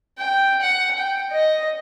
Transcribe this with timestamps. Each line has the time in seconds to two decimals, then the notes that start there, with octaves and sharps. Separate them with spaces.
0.18 G5
0.61 F#5
0.97 G5
1.32 D#5